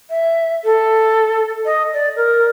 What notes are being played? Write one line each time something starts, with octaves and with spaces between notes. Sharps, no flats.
E5
A4
D#5
D5
A#4